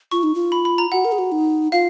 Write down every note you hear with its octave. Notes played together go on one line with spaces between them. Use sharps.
F4 C#6
D#4
F4
B5
B5
A#5
F#4 F#5
A#4
G#4
F#4
D#4
F4 F5